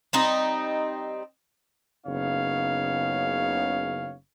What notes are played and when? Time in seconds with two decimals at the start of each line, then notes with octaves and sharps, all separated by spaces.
0.13 G3 C4 D#4
2.06 F#1 C#3 B3 D#4 C#5 F5